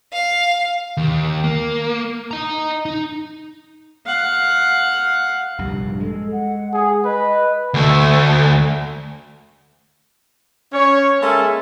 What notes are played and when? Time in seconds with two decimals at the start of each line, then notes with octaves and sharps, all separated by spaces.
0.12 F5
0.97 D#2
1.44 A#3
2.31 D#5 A#5
2.86 D#4
4.06 F5 F#5
5.58 A#1 G2 C3
6.00 G#3 A4
6.32 F#5
6.73 G#4
7.05 B4 D#5
7.74 D2 A3
10.73 C#4 C#5
11.21 G#3 A#3 C#4 G#4 A4 E5